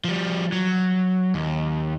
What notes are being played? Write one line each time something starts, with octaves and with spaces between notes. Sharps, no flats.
F3 G3
F#3
D#2